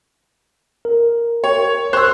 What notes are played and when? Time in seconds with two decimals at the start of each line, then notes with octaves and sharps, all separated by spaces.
0.85 A#4
1.44 C#5
1.93 C5 C6 C#6 E6 F#6